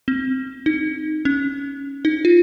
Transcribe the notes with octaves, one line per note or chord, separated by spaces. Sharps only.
C4
D#4
C#4
D#4
F4